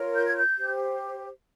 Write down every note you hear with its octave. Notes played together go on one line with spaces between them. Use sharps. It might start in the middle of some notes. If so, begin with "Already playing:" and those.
Already playing: F4 A#4 C#5
G6
G#6
G6
G4 C5